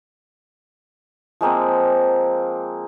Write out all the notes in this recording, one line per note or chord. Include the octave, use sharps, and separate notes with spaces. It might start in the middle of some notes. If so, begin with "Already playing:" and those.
F3 G#3 A#3 C4